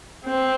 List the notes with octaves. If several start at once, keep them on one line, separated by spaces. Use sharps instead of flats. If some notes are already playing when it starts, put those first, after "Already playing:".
C4